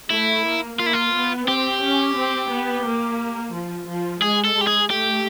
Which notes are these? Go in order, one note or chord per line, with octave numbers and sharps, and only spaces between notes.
A3 E4
A#3
A#3 F4
E4
F4
B3
C4 G4
C#4
C4
B3
A#3
F3
F3
G#3 G#4
A4
G#3
G4
G#4
A3 G4